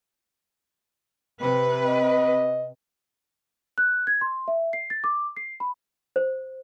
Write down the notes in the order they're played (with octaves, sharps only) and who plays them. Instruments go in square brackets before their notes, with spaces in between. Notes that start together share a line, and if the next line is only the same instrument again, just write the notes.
[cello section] C3 B4
[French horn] D#5
[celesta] F#6
G#6
C6
E5
C7
A6
D6
C7
B5
[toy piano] C5